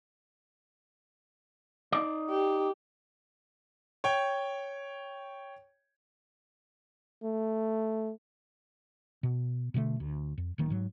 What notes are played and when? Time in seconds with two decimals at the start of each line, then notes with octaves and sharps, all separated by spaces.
1.92 D#4 D5
2.30 G4
4.04 C#5 G5
7.23 A3
9.23 B2
9.74 B2 D3 G#3 A3
10.00 D2
10.38 F2
10.58 D1 D#3 A#3
10.70 G#2 F#3